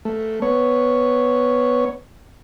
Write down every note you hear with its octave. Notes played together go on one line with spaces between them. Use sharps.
A3
B3 C#5